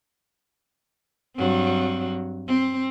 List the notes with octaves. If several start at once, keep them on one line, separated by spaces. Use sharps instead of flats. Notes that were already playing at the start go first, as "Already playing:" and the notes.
G2 F#3 C4
C4